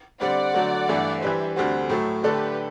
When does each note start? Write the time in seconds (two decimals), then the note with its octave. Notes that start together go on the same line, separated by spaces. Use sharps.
0.20 D3 G3 C4 D5 F#5
0.54 D3 F#3 A3
0.88 G2 E3 A3 E4
1.22 E3 G3 D4 G4 B4 C5 E5
1.56 D2 D3 G3 C4 F#4 A4 C5
1.89 A2 F#3 A3
2.23 D3 A3 D4 G4 A4 B4